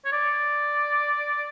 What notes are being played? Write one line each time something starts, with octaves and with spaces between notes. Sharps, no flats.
C#5
D5